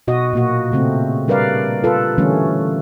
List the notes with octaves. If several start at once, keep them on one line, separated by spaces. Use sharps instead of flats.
B2 F#4 D#5
A#2 A#3 F#4
C#3 A3 C4
G3 D4 A#4 B4 D5 F5
F4 A4 B4
D3 E3 G3 A3 C#4